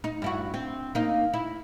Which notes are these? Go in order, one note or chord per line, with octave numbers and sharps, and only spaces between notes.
D#4
G2 E4 F#4
C4
A#3 D#4
E4